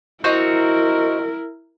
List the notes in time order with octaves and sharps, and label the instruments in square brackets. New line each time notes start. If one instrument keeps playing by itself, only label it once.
[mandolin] C4 D#4 F#4 [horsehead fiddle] E4 A#4